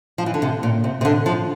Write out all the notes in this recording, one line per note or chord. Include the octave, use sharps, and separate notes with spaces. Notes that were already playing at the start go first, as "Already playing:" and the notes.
F3
E3
D3
C3
A#2
C3
C3
D3
F3